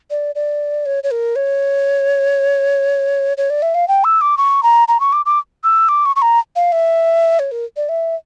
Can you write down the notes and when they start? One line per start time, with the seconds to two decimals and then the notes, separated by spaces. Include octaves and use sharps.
0.10 D5
0.35 D5
0.86 C#5
1.04 C#5
1.11 A#4
1.36 C#5
3.37 C#5
3.50 D5
3.62 E5
3.75 F5
3.88 G5
4.04 E6
4.21 D6
4.37 C#6
4.63 A#5
4.88 A#5
5.00 C#6
5.13 D6
5.26 D6
5.64 E6
5.89 D6
6.05 C#6
6.16 C#6
6.22 A#5
6.56 F5
6.72 E5
7.39 C#5
7.51 A#4
7.77 D5
7.89 E5